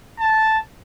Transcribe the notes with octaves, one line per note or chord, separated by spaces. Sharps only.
A5